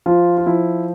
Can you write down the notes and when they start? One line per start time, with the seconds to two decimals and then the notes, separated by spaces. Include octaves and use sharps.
0.06 F3 F4
0.38 F4
0.46 F3 E4